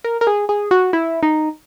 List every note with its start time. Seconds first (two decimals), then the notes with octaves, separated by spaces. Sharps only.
0.04 A#4
0.21 A#4
0.27 G#4
0.49 G#4
0.71 F#4
0.93 E4
1.23 D#4